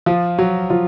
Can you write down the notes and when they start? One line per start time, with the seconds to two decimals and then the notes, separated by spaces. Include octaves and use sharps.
0.06 F3 F4
0.38 F#3 F#4
0.70 F3 F4